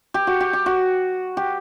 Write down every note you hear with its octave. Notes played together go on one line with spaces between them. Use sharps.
G4
F#4
G4
G4
F#4
G4